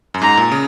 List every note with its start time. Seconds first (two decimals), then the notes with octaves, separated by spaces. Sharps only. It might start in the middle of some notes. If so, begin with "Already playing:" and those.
0.14 F#2
0.22 G#2 A#5
0.37 A#2
0.52 C#3